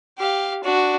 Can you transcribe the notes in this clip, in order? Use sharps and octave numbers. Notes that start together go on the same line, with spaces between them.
G4 F5
D4 F#4